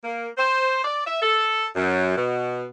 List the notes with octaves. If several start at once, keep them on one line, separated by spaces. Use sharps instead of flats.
A#3
C5
D5
E5
A4
F#2
B2